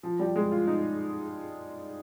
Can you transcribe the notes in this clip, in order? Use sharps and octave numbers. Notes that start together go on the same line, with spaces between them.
F3
G3
G#3
F4
D#4